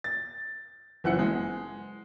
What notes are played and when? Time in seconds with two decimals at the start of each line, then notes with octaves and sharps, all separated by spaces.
0.04 A6
1.04 F#1 E3 F#5 C#7
1.19 G#3